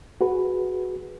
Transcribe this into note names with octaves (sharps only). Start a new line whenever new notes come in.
F#4 G#4 B4